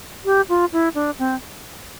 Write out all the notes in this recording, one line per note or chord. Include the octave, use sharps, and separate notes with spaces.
G4
F4
E4
D4
C4